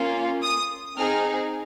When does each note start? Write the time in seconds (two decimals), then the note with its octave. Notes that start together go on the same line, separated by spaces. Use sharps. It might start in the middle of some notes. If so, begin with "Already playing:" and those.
Already playing: A#3 C#4 F4
0.43 D#6
0.97 C4 D#4 G#4 F6